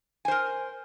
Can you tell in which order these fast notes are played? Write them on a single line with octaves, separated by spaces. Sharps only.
G#5 C5 A#4